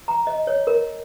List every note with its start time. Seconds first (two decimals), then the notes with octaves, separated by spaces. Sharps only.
0.08 A#5
0.27 D#5
0.47 C#5
0.67 A#4